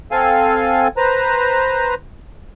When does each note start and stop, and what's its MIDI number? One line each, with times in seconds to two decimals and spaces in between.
0.11 0.88 60
0.11 0.88 69
0.11 0.88 77
0.11 0.88 80
0.97 1.94 71
0.97 1.94 72
0.97 1.94 82